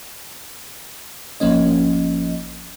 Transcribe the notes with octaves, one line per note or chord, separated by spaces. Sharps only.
G#1 F3 A#3 C#4 D#5